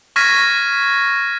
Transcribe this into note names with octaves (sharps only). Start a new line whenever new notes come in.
C#6 F6 G#6 A#6 B6 D#7